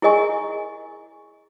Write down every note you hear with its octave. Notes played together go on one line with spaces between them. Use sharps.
E4 G#4 A#4 D#5 G#5 C#6